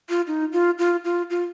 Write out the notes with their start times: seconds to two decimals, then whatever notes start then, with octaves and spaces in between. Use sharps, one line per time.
0.09 F4
0.27 D#4
0.53 F4
0.78 F4
1.04 F4
1.30 F4